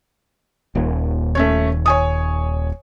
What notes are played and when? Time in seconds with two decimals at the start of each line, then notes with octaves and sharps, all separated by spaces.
0.75 D#1 D#2
1.35 A3 C#4 C#5
1.86 C#5 G#5 D#6